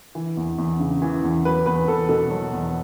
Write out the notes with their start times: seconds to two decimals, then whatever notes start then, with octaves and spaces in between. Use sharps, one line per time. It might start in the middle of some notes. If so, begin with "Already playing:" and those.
0.15 E3
0.37 E2
0.58 E2
0.80 C#3
1.02 E3
1.24 E2
1.45 F#3 B4
1.66 E2 B4
1.88 E2 A4
2.09 B2 A4
2.31 F#3
2.53 E2